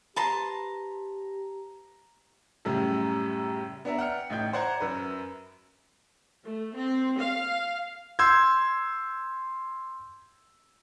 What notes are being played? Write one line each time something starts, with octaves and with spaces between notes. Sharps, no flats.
G4 B4 A5 A#5 C6
F#2 A2 C#3 G3
B3 D4 D5 E5 A#5
F#5 G5 F6 C#7
A1 A2 D#4 G5 G6
C5 D5 F#5 A#5 G#6
F#2 A#4 B4
A3
C4
F5
C6 E6 G6 G#6